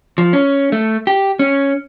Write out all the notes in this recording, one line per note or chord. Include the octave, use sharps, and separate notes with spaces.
F3
C#4
A3
G4
C#4